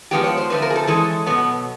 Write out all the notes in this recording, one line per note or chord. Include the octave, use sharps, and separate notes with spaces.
F3 G#3 B3 D4 G4
C#5
C5
D3 F3 A3 C4 B4
A#4
G#4
A4
E3 G#3 C#4 A4
B2 F#3 B3